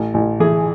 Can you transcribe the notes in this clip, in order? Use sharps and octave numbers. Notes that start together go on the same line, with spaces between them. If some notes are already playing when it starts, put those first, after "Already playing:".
Already playing: A1
A1
E3 G#4